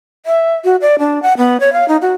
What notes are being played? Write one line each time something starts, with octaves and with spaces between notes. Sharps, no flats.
E5
F#4
D5
D4
F#5
B3
C#5
F5
D#4
F#4